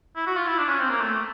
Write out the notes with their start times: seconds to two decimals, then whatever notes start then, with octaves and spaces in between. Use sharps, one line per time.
0.16 E4
0.26 F#4
0.37 F4
0.48 E4
0.58 D4
0.69 C#4
0.80 C4
0.89 A#3
1.01 A3